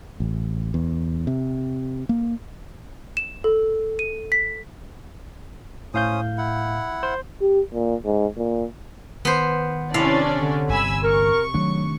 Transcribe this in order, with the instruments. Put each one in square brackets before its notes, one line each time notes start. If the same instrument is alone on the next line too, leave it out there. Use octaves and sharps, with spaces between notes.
[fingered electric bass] A1
E2
C3
A#3
[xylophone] E7
A4
D#7
B6
[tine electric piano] A2 F5 G6 [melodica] C#4 C5 D#6
[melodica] E4 F#5
[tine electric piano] C5
[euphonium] G4
A#2
G#2
A#2
[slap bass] D#3 [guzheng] B3 C5
[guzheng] C3 F5 [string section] C#4 D4 D5 [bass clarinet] E4
[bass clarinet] D3
[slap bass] G1 [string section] G#5 B5 E6
[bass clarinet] A#4 [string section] C#6
[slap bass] D#3 A3 D4 [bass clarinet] F#3